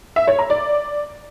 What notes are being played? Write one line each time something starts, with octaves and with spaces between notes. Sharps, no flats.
E5
C#5
A#5
D5